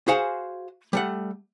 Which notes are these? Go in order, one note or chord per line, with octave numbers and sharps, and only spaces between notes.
F#4 G#4 C5 F5 F#5 G#5
G3 A3 F#5